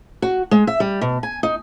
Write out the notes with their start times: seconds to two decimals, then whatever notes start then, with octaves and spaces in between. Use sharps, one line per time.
0.22 F#4
0.51 G#3
0.67 E5
0.80 G3
1.01 B2
1.23 G#5
1.43 D#4